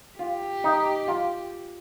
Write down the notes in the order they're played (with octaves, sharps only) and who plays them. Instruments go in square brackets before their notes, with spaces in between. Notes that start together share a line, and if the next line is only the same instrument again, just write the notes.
[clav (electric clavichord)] F4 [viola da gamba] G4
[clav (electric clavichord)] D#4
F4